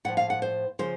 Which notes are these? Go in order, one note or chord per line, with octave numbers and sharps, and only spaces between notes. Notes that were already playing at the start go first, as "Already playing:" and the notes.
A2 F3 F#5
F5
F#5
C5
C#3 F3 C5